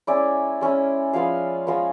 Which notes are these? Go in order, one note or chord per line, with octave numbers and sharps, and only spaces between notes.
G#3 C#4 E4 D5
G#3 C#4 E4
F3 G#3 B3 F5
F3 G#3 B3